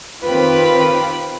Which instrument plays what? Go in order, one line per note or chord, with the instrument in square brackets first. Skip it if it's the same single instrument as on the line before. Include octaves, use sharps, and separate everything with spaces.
[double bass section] D#3 C4 [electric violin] F4 [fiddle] G4 B5 [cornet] B4